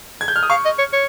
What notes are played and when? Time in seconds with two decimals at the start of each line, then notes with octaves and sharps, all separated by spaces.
0.21 G#6
0.28 G6
0.36 F6
0.43 D#6
0.50 F5 C#6
0.65 D#5
0.79 C#5
0.93 C#5